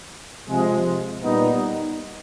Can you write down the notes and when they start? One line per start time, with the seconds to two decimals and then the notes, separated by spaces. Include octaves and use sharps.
0.48 C3 F3 G#3
1.22 A#2 G3 B3 D#4